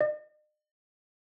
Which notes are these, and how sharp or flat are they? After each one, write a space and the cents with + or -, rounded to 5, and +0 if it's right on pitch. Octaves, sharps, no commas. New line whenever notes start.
D#5 -45